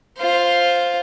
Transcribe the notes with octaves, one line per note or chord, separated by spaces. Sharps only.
F4 C5